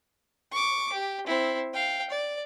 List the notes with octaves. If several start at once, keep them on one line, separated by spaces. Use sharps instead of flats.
C#6 D6
G4
C4 E4
F5 G5
D5